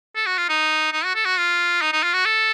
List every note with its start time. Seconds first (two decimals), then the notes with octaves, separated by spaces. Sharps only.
0.16 A4
0.26 F#4
0.38 F4
0.49 D#4
0.92 D#4
1.04 F#4
1.15 A4
1.25 F#4
1.37 F4
1.82 D#4
1.93 D#4
2.03 F4
2.13 F#4
2.25 A4